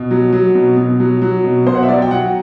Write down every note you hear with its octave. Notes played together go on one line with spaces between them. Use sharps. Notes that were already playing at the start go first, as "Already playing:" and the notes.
Already playing: B2
F#3
F#3
B2
B2
F#3
F#3
B2
B2 C5
F#5
E5
F#3 D5
G5
F#3 F#5